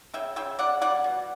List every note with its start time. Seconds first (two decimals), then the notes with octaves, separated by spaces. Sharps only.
0.14 C#3 E5 G5
0.36 C#3 E5 G5
0.59 C#3 D5 F#5
0.81 G3 D5 F#5
1.04 B2